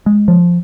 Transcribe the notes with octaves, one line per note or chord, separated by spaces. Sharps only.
G#3
F3